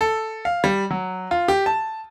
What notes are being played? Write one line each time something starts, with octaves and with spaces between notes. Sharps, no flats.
A4
F5
G3
F#3
F4
G4
A5